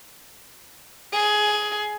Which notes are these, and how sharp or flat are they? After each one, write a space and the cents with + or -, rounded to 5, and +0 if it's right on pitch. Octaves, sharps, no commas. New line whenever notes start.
G#4 +15